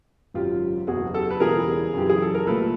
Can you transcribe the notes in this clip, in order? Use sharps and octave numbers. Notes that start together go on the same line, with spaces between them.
G#1 F#2 C#3 F#3 F4 G4
F#1 E2 B2 F#4 G#4
G4 A4
B4
E1 E2 C#3 E3 G3 G#4 A#4
F#2 C#3 E3 G4
G#4
A4
A#4
C2 A#2 F3 A3 A4 B4